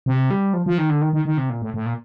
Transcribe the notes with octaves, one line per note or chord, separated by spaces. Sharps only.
C3
G3
F3
F3
D#3
D3
D#3
D#3
D#3
C3
A#2
A2
A2
A#2